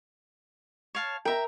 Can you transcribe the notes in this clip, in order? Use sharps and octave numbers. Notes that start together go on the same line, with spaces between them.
C#5 F5 A5
A#4 E5 G5 A#5